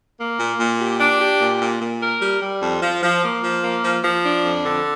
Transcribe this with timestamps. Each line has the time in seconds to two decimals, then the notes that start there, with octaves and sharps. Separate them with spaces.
0.19 A#3
0.40 A#2
0.60 A#2
0.80 G4
1.00 D4
1.21 G4
1.41 A#2
1.62 A#2
1.82 A#2
2.02 A#4
2.22 G3
2.42 G3
2.62 F2
2.83 F3
3.03 F3
3.23 A#3
3.44 F3
3.64 A#3
3.84 F3
4.04 F3
4.25 D4
4.45 F2
4.65 D3